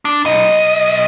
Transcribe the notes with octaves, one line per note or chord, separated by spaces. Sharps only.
D4
B1 D#5